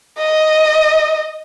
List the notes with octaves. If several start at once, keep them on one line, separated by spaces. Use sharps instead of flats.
D#5